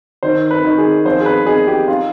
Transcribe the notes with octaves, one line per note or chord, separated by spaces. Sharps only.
D#3 C5
B4
D#3
G#4
F3 C5
G#4
B4
D#4 G#4
G4
D#4 F4